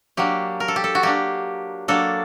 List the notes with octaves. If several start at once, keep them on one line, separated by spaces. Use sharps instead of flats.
F#3 A#3 D4 G4
A#4
A4
G4
A4
F#4
F#3 A#3 D4 G4
F#3 A#3 D4 A4